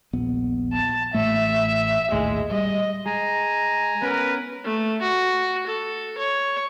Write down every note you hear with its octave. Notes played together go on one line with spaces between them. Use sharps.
D#1 A#1 B3
A5
A1 A2 A3 E5
A#1 D#2 A2 G#3
G3 D#5
G#3 G#5 A#5
B3 C#4 A#4 B4
A3
F#4
A4
C#5